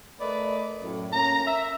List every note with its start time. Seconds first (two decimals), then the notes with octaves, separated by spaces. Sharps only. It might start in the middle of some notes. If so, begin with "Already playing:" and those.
0.20 A3 A#4 B4 D5 D#5
0.83 F#2 A2
1.12 A#3 C#4 A#5
1.46 E5